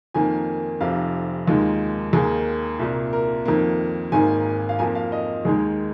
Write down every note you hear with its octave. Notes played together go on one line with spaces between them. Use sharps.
F2 D#3 A#3 G#5
F1 F2 C3 F5
D#2 D#3 G#3 F4
D#2 D#3 A#3 G#4
C2 A#2 A#3
A#4
F2 D#3 A#3
G#1 G#2 D#3 A#3 G#5
F5
F2 F3 A#3 G#5
F5
D#5
D#2 D#3 G#3 G#4